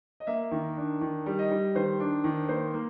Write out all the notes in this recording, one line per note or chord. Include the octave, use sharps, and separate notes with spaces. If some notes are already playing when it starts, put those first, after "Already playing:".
D#5
A#3 E5
D#3
D4
D#3
G3
D#5
G3
D#3 C5
D4
D#3
A#3 C5
A#3